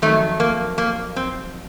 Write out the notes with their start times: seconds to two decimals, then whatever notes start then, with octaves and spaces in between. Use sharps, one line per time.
0.02 F2 D#3 F#3 A3
0.40 A#3
0.78 A#3
1.16 C4